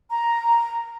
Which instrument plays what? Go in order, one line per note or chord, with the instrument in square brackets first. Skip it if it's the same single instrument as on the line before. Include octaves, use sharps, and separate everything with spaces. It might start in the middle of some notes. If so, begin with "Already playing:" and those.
[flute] A#5